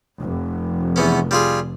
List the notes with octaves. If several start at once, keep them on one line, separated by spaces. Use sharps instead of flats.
F1
E2 B3 C#4
G3 F4 G#4